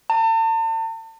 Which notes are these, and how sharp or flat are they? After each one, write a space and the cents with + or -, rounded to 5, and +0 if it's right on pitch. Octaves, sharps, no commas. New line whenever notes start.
A5 +40